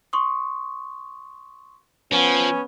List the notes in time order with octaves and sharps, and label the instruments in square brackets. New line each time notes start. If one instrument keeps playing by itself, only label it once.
[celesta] C6 C#6 D#6
[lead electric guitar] F3 [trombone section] B3 C#4